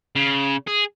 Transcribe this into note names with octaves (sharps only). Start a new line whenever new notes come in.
C#3
G#4